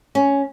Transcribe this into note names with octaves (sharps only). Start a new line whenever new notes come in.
C#4